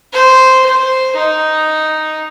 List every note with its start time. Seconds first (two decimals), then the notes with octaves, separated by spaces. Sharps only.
0.14 C5
0.66 C5
1.16 D#4